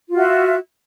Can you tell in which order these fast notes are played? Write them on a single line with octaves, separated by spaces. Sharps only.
F4 F#4 E5